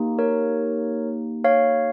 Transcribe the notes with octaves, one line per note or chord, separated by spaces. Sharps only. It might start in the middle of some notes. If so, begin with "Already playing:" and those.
Already playing: A#3 D#4 G4
A#4 C#5
C#5 F5